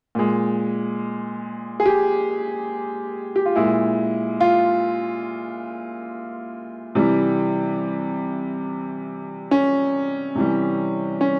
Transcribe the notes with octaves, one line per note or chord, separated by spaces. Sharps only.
A#2 G#3
G#4
G4
G4
F4
A#2 G#3 E4
F4
C3 E3 G3
C#4
C3 E3 G3
C#4